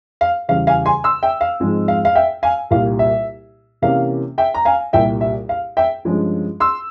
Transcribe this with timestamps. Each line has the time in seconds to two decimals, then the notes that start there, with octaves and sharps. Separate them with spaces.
0.21 F5
0.48 E2 C#3 G3 F5
0.67 F5 G#5
0.86 G#5 C6
1.04 C6 E6
1.23 E5 G5
1.41 F5
1.60 G#2 F3 G#3 C4
1.88 F5
2.05 F5
2.15 E5 G5
2.43 F5 G#5
2.71 C2 A#2 G3 F5
2.99 E5
3.82 C3 E3 A#3 C#4 F5
4.38 E5 G5
4.54 A#5
4.65 F5 G#5
4.93 C2 A#2 G3 E5 G5
5.21 E5
5.49 F5
5.77 E5 G5
6.05 G2 F3 G#3 C#4
6.60 C6 E6